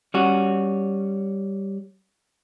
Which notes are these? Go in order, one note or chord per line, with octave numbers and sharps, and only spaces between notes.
G3 C#4 F#4